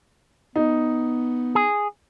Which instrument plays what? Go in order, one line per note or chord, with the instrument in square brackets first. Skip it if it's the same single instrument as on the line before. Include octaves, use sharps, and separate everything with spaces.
[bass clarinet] B3 [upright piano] D#4
[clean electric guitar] G#4